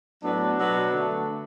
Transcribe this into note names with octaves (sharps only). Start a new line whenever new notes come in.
A2 F#3 B3 D4
B2 F#3 B3
D3 A3